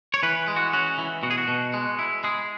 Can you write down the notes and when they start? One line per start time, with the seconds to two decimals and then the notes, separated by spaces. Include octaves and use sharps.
0.14 C#5
0.23 E3 B4
0.48 G#3
0.56 F#4
0.73 C#4 F#4
0.98 E3
1.23 B2 F#4
1.31 G#4
1.38 F#4
1.48 B2
1.74 G#3
1.99 E4
2.24 G#3 G#4